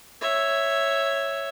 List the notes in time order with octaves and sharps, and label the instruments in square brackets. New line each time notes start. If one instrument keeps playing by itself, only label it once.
[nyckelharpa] C#5 E5